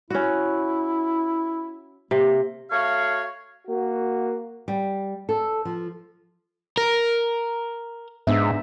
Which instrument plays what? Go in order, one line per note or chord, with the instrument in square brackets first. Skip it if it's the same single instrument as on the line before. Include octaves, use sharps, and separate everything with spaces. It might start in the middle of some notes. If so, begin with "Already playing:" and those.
[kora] C#4 F#4 [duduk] E4
[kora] C3 [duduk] A#3
[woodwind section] A3 F#4 C#5 F5
[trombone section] A#3 F#4
[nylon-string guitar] G3
A4
F3
[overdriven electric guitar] A#4
[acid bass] G#2 [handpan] B3 D4 E5